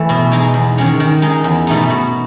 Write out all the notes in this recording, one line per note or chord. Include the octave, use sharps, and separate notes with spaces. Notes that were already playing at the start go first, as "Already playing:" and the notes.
Already playing: E3 A3
B2
G#3 D#4
E2
D#3 G#3 C#4
D#3
G#3 D#4
E2
B2 A3 D#4
B2